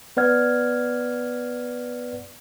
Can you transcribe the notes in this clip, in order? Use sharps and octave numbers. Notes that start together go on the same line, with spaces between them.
B3 B4 D5 F#5 F6 G#6